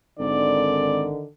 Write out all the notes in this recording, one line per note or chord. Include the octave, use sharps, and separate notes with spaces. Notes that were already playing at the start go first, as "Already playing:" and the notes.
G#1 D3 D#3 D5